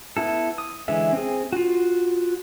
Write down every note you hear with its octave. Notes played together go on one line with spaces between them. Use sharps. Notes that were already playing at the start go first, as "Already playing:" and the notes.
B3 E4 A4
D#6
D3 E3 G#3 E5
C4 G#4
F4 F#4